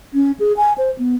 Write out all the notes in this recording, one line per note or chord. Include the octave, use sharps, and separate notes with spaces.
C#4
G#4
G#5
C5
B3